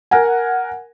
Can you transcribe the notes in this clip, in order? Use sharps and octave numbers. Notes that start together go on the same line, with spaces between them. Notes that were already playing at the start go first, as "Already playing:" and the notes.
A#4 F#5 G#5